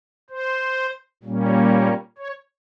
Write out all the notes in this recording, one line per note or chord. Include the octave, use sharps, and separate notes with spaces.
C5
A#2 G3 A#3 C#4
C#5